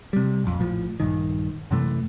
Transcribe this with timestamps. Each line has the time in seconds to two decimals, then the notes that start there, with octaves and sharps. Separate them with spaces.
0.13 C3 G3
0.44 A#1 F2
0.59 A#1 A2 F3
1.00 A#1 G2 D#3
1.71 F#2 C3 E3 A3